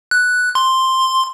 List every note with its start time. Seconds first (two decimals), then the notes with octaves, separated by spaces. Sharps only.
0.11 F#6
0.55 C6